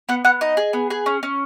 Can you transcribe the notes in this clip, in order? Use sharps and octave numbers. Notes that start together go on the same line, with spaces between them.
B3 F#5
B3 F#5
D#4 D#5
G#4
B3
G#4
C#4
C#4